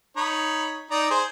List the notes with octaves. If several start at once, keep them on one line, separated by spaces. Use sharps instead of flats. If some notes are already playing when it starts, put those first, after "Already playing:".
D#4 C#5 B5
D#4 D5 A#5
G#4 C5